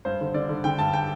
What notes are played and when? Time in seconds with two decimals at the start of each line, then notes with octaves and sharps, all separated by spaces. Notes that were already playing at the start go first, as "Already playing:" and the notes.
0.05 G2 C5
0.21 D3
0.34 D3 D5
0.49 D3
0.64 D3 G5
0.78 G2 A5
0.93 G5